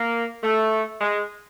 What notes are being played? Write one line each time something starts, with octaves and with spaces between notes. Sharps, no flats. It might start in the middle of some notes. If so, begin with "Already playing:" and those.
Already playing: A#3
A3
G#3